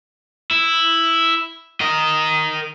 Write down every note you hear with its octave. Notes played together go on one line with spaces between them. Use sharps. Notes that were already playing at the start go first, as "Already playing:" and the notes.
E4
A#4 D#5